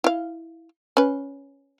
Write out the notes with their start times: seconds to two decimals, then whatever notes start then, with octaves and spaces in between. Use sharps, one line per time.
0.04 E4 F5
0.97 C#4 B4